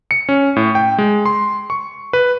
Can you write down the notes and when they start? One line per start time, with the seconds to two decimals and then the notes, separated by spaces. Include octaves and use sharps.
0.11 C#7
0.29 C#4
0.56 A2
0.75 G5
0.98 G#3
1.25 C6
1.70 C#6
2.13 B4